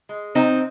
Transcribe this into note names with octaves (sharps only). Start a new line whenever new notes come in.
G#3
C3 C4 D#4